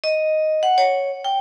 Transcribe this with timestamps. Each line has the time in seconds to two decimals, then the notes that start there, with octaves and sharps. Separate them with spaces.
0.04 D#5
0.63 F#5
0.78 C#5
1.24 G5